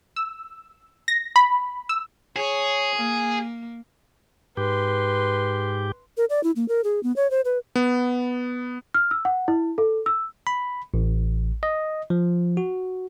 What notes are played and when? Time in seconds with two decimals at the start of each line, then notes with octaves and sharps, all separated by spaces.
0.16 E6
1.08 A#6
1.36 B5
1.89 E6
2.36 G#4 C#5
2.96 A#3
4.57 G#2 G4 B4 C6
6.17 A#4
6.30 D5
6.43 E4
6.56 A#3
6.68 A#4
6.84 G#4
7.03 B3
7.16 C#5
7.31 C5
7.45 B4
7.76 B3
8.94 F6
9.11 E6
9.25 F#5
9.48 E4
9.78 A4
10.06 E6
10.47 B5
10.94 A1
11.63 D#5
12.10 F3
12.57 F#4